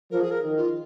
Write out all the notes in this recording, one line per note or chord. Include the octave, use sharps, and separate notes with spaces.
F3 A#4
G#4
A#4
D#3
F4